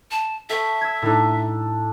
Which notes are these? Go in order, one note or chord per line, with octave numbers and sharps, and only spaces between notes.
A5
A4 E5 G5 C#6
E6 G#6
A2 D4 D#4 A4